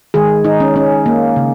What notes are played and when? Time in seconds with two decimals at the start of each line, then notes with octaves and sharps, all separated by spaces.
0.14 D#3 G#3 G#4
0.44 D#4
0.60 C#4
0.76 C#4
1.06 A#3
1.36 C#3